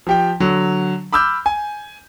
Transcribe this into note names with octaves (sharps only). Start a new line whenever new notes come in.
F3 G4 G5
D3 F#3
B5 D6 E6 F6 G6
G#5